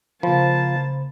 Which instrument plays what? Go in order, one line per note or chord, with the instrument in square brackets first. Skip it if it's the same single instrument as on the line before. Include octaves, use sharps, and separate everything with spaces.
[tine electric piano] C#3 C5 B5 [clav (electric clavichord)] F3 [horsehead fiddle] A#3 A5